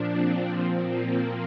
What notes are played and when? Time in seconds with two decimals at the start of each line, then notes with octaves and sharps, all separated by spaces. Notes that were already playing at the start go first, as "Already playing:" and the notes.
Already playing: A#2 F3 D4
0.13 C4
0.51 A#2 F3
0.89 A#3